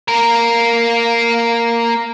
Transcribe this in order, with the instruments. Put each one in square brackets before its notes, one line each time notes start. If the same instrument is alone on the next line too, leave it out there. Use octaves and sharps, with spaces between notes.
[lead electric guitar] A#3 A#4